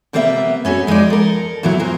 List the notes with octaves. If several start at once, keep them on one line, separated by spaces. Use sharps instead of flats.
C3 G3 A#3 B3 D#5 E5
B3 C#4 F#4 A4
F3 G#3 B3 D#4 D5
A4 A#4
E2 A#2 F#3 B3 E4
B3 F4 G#4 A#4 C5